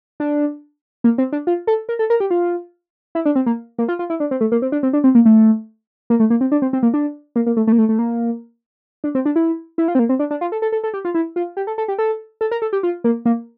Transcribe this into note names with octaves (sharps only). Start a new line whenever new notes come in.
D4
A#3
C4
D4
F4
A4
A#4
A4
A#4
G4
F4
E4
D4
C4
A#3
A#3
F4
F4
E4
D4
C4
A3
A#3
C4
D4
C4
D4
C4
A#3
A3
A#3
A3
A#3
C4
D4
C4
C4
A#3
D4
A#3
A#3
A3
A3
A#3
A3
A3
A#3
D4
C4
D4
E4
E4
F4
C4
A#3
C4
D4
D4
F4
A4
A4
A4
A4
G4
F4
E4
F4
G4
A4
A4
G4
A4
A4
A#4
A4
G4
F4
A#3
A#3